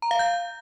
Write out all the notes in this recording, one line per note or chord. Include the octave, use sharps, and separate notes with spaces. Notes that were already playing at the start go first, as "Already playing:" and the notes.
A#5
F5
G6